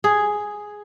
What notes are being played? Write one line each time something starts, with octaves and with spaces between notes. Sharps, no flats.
G#4